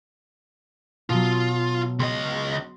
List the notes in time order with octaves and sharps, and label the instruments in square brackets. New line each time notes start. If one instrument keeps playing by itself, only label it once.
[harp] B2 F#3 [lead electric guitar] F4
[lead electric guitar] C#2 D#5 [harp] C6